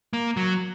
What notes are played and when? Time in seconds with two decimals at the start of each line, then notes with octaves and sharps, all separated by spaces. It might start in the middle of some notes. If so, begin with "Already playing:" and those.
0.13 A#3
0.37 F#3